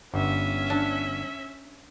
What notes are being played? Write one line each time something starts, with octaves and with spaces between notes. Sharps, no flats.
G1 G2 C#4 E5
D4